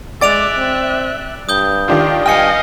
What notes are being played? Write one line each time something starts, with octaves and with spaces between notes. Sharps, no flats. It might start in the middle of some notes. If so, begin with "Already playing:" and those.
G#3 D5 E5 D6 F#6 A6 D7 F7
C4
G2 D#6 G6 G7
D#3 D4 F4 G4
G2 D#5 F5 G5 G#5 F6 C#7